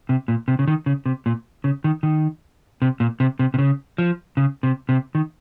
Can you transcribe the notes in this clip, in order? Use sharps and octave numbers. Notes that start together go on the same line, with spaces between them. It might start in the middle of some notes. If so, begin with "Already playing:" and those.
C3
A#2
C3
C#3
D#3
C#3
C3
A#2
C#3
D#3
D#3
C3
A#2
C3
C3
C3
C#3
F3
C#3
C3
C3
D#3